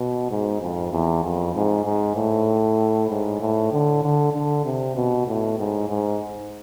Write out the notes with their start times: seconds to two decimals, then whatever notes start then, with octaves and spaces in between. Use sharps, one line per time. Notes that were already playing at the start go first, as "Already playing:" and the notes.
Already playing: B2
0.31 G#2
0.61 F2
0.92 E2
1.24 F2
1.55 G#2
1.85 G#2
2.16 A2
3.10 G#2
3.41 A2
3.72 D3
4.03 D3
4.33 D3
4.65 C3
4.96 B2
5.27 A2
5.58 G#2
5.89 G#2